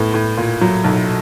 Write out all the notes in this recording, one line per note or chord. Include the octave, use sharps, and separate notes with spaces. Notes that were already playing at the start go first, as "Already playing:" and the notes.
Already playing: A2 B3
A2
A#2
F#3
B1